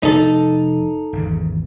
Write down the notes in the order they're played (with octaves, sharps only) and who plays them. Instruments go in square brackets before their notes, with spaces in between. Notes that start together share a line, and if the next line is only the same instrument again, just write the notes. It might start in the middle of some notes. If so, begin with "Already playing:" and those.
[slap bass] F1 [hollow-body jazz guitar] D#4 A4
[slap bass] G#1 E2 C#3